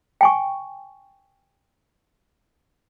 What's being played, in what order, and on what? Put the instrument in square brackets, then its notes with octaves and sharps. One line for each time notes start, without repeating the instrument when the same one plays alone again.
[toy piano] G5 G#5 C#6